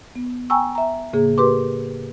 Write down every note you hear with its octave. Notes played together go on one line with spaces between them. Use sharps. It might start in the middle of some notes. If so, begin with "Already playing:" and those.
B3
G5 G#5 A#5 C#6 E6
E5 A#5
A2 C#3 A#3 G#4
G4 A#4 B4 C6 D6